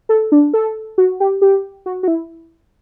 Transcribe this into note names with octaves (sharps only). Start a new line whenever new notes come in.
A4
D4
A4
F#4
G4
G4
F#4
F#4
E4